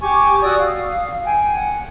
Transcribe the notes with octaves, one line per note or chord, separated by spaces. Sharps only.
G4 G#5 C#6 D6
F#4 D5 D#6 E6
F5
G5 G#5
F#5